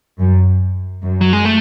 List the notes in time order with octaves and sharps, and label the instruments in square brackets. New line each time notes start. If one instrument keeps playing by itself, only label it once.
[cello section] F#2
F#2
[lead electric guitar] F#3
G#3
A3